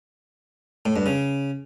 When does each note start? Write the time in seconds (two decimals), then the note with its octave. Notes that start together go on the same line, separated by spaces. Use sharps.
0.86 A2
0.96 G2
1.06 C#3